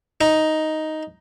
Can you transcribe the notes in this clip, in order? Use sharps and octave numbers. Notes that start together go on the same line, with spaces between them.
D#4